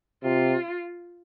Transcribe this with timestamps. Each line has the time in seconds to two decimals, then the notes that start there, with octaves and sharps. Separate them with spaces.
0.24 C3 F4